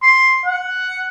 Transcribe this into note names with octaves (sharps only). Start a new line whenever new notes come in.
C6
F#5